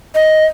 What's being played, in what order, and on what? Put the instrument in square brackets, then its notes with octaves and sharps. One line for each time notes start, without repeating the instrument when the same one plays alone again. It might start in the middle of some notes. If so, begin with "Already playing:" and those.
[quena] D#5